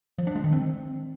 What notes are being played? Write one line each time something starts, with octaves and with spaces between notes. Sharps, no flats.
F3
D4
G#3
D#3
C4